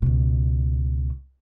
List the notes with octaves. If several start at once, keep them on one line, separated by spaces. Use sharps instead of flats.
C#2 B2